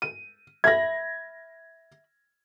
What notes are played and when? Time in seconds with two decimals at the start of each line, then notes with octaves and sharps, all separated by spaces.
0.02 D#7
0.64 E5 B5 G#6 A#6